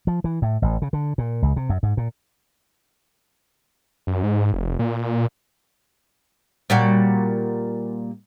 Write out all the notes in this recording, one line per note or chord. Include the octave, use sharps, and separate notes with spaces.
F3
E3
A2
A1
C#3
D3
A#2
C#2
C3
F#2
G#2
A#2
F#2
G#2
F1
A#2
A#2 G3 F#4